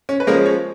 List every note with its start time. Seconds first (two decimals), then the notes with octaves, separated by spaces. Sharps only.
0.09 C#4
0.20 B4
0.27 F3 G#3 A#3 C#4 A#4
0.46 C#4 C#5